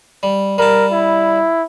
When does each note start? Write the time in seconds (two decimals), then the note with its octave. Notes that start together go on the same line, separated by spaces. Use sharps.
0.23 G3
0.58 G3 A#4 A5
0.92 E4